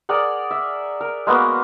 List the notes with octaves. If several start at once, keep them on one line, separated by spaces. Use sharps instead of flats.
G#4 A#4 D5 F#5
E5
A#4
G#3 A#3 B3 F#4